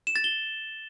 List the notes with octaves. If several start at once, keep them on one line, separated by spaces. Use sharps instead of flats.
E7
A6
G7